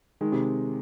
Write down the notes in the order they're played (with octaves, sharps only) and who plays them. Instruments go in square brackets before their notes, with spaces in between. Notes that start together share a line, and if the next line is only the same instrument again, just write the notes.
[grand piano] D#3 G#3
C3